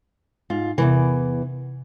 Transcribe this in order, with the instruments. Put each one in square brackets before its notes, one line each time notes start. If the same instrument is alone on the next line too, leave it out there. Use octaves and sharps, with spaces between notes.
[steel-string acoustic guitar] G#2 F4
[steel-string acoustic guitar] E2 G#2 E3 [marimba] C3